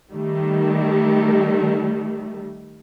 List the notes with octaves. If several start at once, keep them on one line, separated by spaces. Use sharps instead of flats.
D#3 G3 A3